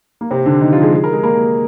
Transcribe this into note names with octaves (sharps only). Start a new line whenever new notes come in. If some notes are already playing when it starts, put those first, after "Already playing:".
A#3
C3 C4
D3 D4
D#3 D#4
F3 F4
G#3 G#4
G#4
A#4
G#3 G#4
A#3 A#4